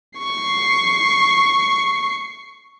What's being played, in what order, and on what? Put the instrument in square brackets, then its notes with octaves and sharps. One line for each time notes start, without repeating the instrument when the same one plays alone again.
[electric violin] C#6 C7